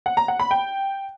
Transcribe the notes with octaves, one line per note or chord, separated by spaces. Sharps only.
F#5
A#5
F#5
B5
G5